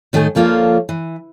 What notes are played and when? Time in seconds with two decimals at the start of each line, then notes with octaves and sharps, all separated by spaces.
0.13 A2 D#3 A3 B4 G#5
0.35 D2 F3 A#3 F4 A4 C#5
0.89 E3